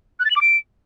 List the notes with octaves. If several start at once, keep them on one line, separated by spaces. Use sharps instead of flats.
F#6
A6
F#7
D6
D7